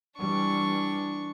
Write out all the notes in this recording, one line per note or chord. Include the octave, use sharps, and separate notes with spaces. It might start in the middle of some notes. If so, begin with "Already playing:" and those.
E3 G3 D4 C#6